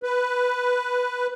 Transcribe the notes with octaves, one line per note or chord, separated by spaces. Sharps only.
B4